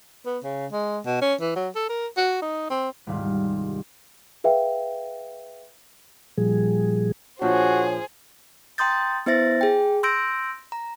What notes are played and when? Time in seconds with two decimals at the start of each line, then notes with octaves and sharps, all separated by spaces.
0.26 B3
0.44 C#3
0.72 G#3
1.06 B2
1.22 C#4
1.40 E3
1.56 F#3
1.75 A4
1.89 A#4
2.17 F#4
2.41 D#4
2.70 C4
3.07 D#1 C2 G#2 G3 D5 F5
4.44 G#4 B4 E5 F5 G5
6.38 A#2 F3 G3 G#4
7.42 A#2 F3 D4 F#4 G#4 C5 C#5
8.78 G5 A#5 C6 D#6 G6 A6
9.26 B3 E4 C5 E5 A6 A#6
9.61 G#4 G5
10.03 C6 E6 G6 A#6 D7
10.72 A#5